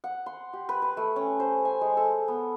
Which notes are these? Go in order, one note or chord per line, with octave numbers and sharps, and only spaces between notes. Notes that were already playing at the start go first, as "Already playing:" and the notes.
F#5
C6
G4
B4
B4
A3
C#4
C5
G#5
G#3
A4
B3